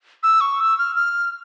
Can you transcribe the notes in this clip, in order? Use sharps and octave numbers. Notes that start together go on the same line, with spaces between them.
E6
C#6
E6
F6
F6